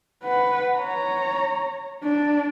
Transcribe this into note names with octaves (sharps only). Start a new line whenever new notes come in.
B4 F#5
C#5 A#5
D4